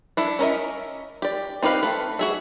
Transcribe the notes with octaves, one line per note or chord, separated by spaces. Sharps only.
D4 E4 A4
C#4 A#4 D#5 E5
G4 D5
C4 D#4 G4 B4 F5
A3 B4
F#4 G#4 E5